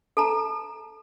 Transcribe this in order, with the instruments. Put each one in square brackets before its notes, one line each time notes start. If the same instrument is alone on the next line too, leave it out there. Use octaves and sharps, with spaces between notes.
[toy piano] A4 A5 A#5